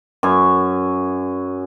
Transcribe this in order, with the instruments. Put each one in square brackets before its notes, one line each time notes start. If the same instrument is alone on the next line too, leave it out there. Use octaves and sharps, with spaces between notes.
[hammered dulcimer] F#2 G#5